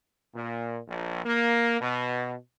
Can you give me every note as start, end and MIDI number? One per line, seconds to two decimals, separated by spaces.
0.34 0.79 46
0.88 1.23 34
1.24 1.77 58
1.81 2.35 47